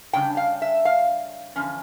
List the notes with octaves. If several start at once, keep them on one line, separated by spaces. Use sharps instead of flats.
C#3 G3 D4 G5
F5
E5
F5
E2 D3 F3 C#4